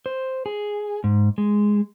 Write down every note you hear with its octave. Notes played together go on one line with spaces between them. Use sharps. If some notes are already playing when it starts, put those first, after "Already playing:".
C5
G#4
G#2
G#3